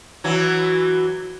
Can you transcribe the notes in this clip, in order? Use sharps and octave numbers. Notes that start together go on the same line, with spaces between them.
E3 F#3